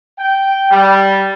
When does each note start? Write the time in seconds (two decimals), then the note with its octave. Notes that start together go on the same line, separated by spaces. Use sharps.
0.19 G5
0.70 G3